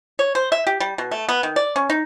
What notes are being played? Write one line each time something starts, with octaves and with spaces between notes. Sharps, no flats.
C#5
C5
E5
G4
G3
B2
A3
B3
D#3
D5
C#4
D#4